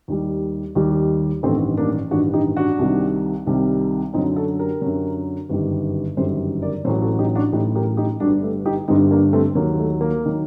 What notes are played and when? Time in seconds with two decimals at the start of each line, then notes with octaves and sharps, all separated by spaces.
0.08 D#2 D#3 G3
0.75 D#2 D#3 G3
1.43 A1 G2 D#3 A3 C4
1.77 A#3 D4
2.11 A1 G2 D#3 D4 F#4
2.34 D#4 G4
2.56 D4 F#4
2.79 C2 C3 D#3 G3
3.47 C2 C3 D#3 G3
4.14 F#2 D3 F#3 C4 D#4
4.36 F#4 A4
4.59 G4 A#4
4.82 F#2 D3 F#3
5.49 G1 F#2 D#3 G3
6.17 G1 F#2 D#3 G3 A4 C5
6.62 A#4 D5
6.85 A1 A2 F#3 A4 C5
7.02 F#4 A4
7.19 D#4 G4
7.35 D4 F#4
7.52 A1 A2 F#3 D#4 G4
7.75 G4 A#4
7.97 D#4 G4
8.20 G1 G2 D3 G3 D4 F#4
8.43 A3
8.66 D#4 G4
8.88 G1 G2 D3 G3 C4 D#4
9.11 A#3 D4
9.33 A3 C4
9.55 D#2 D#3 F#3 A#3
9.79 A3
10.01 A#3
10.26 D#3 F#3